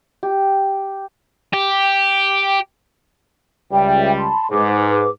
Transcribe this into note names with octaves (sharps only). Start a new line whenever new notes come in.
G4
G4
C#2 G3 E5 G5
A5 B5 C6
G#2 G#4 B4 D6